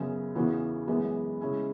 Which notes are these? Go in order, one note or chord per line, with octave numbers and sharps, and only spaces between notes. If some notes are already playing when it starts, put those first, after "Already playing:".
Already playing: F#2 C#3 F#3 B3
E2 C#3 E3 B3 F#4
F#2 E3 G#3 B3
C#3 G#3 C#4 E4